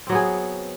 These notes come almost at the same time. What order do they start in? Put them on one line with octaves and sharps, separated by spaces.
C4 F#3 B3 G#4